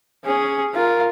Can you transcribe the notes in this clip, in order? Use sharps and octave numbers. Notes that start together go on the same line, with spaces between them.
C#4 G#4
F4 A#4